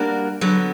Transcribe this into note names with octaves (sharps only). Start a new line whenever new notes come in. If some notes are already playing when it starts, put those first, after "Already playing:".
Already playing: G3 A#3 D4 F#4 A#4
D3 F#3 B3